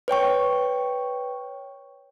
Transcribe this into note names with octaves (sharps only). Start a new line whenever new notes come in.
B4 C#5 G5 C#6